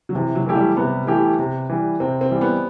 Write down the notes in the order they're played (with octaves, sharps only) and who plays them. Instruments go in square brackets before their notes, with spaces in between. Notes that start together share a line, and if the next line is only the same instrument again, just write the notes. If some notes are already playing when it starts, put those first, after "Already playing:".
[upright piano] F#3
[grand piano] C3 [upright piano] E3
[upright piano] F#3
[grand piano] E3 A3 E4 G4
[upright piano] G3
[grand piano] C3 [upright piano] B3
[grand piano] E3 A3 E4 G4
C3
E3 G3
[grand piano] C3 [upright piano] C4
[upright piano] C4
[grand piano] E3 G3
[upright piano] B3